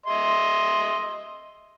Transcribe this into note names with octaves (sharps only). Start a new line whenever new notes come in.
D#5 E5 C6